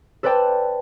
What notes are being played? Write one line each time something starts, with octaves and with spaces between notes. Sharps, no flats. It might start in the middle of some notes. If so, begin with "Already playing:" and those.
A4 B4 C5 D5 G5 A5